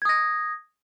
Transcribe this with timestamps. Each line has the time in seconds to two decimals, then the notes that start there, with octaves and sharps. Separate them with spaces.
0.02 G#6
0.05 D#6
0.09 A#6